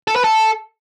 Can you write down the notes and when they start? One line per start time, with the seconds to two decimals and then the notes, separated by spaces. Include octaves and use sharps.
0.08 A4
0.16 B4
0.24 A4